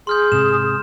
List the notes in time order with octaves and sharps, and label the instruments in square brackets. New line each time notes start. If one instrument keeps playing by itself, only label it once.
[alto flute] G#4 [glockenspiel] C6 F6 G6
[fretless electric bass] G#2 C3 [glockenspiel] E7